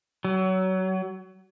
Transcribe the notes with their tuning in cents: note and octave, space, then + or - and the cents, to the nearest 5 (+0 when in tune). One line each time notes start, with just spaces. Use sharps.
F#3 +25